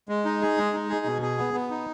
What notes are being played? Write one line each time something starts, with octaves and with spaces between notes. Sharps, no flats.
G#3
D#4
G#4
G#3
D#4
G#4
B2
G#4
B3
B3
D#4